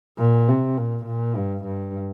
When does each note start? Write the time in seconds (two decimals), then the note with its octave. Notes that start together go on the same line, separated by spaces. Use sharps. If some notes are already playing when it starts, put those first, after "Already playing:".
0.18 A#2
0.48 C3
0.77 A#2
1.06 A#2
1.36 G2
1.65 G2